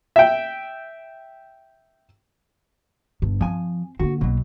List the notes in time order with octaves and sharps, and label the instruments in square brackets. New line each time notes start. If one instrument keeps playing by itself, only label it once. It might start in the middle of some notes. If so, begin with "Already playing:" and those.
[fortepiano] E5 G5
[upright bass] G1 G2
[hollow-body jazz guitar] F3 G#5 [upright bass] C4
[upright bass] D3 A#3 [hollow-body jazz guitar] F#4
[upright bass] B1 A#3 [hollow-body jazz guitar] B2 F#3